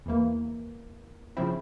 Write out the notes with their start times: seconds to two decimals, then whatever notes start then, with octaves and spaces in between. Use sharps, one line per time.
0.06 E2 E3 A#3
1.37 C#3 F3 C4 E4